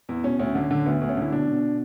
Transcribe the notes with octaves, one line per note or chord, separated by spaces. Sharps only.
E2 E4
B2 C#4
D2 C#4
D3
D3
D2 B3
D2
C#4
D3 E4
B2 D4
B2